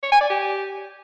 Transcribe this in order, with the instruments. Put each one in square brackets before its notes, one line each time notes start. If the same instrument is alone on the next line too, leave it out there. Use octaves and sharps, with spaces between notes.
[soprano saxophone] C#5
G#5
D5
G4